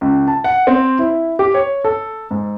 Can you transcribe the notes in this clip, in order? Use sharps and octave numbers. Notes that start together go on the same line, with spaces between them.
C#2
A5
F#5
C4
E4
G4
C#5
A4
G#2